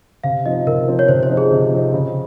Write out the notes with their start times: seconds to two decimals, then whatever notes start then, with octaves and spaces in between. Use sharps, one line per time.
0.24 C3 F5
0.45 F3 C4 D#4 D#5
0.67 C3 A#4
0.87 F3 C4 D#4
0.99 C#5
1.08 C3 C5
1.23 C5
1.29 F3 C4 D#4
1.37 G#4
1.51 C3
1.72 F3 C4 D#4
1.93 C#3